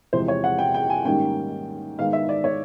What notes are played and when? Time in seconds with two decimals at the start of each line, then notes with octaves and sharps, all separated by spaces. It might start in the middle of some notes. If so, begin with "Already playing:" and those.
0.13 E2 C3 F3 G#3 C5
0.28 C#5
0.44 F#5
0.59 G5
0.74 G5
0.90 G#5
1.05 G#2 D#3 G3 A#3 C#4 G5
1.99 G#2 D#3 G#3 B3 F5
2.13 E5
2.29 D5
2.44 C#5